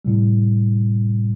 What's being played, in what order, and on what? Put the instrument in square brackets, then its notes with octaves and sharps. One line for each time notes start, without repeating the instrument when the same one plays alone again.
[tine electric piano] A2 C3 G3